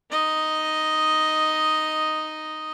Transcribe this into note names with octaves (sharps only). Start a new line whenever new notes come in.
D#4 D#5